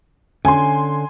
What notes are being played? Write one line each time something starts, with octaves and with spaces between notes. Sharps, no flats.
D3 C#4 G#5 C6